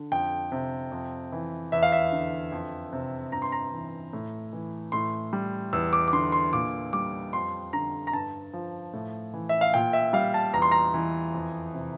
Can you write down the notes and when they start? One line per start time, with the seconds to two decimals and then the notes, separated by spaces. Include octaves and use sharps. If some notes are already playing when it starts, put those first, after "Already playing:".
Already playing: D3
0.12 F2 G5
0.52 C3
0.92 F2
1.32 E3
1.72 E2 E5
1.82 F5
1.92 E5
2.12 D3
2.52 F2
2.93 C3
3.32 G2 A#5
3.42 C6
3.52 A#5
3.72 E3
4.13 A2
4.53 E3
4.92 A2 C6
5.33 G3
5.73 E2 E6
5.93 D6
6.08 D6
6.13 D3 C6
6.32 C6
6.53 A#2 D6
6.93 G3 D6
7.33 F2 C6
7.73 D3 A#5
8.07 A#5
8.13 G2 A5
8.53 F3
8.93 A2
9.34 E3
9.49 E5
9.61 F5
9.74 A#2 G5
9.93 E5
10.13 G3 F5
10.34 A5
10.53 E2 A#5
10.62 C6
10.71 A#5
10.94 E3
11.34 F2
11.74 C3